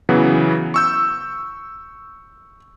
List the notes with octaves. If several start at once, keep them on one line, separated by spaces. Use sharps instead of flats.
C#3 E3 F#3 B3
C#6 E6 G6